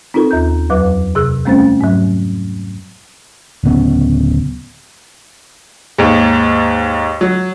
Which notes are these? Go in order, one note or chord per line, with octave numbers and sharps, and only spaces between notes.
C4 D#4 F4 A4 A#4
D#2 A#5 G6
F2 F#3 B4 D6
C3 G#4 E6 F#6
G3 A3 C4 C#4 C5 A6
G#2 F#3
D1 C#3 B3 C#4
D#2 G#2
F#3